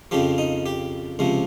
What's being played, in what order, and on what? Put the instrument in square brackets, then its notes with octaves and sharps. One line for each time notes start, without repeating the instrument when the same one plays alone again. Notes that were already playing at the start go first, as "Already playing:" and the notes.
[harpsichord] F2 C#3 F3 G4
D#4
G4
C#2 C3 F3